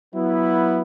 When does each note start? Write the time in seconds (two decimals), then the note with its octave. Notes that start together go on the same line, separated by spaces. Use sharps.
0.14 F#3 B3 E4